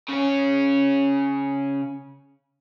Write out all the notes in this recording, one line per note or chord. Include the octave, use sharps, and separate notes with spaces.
C#3 C#4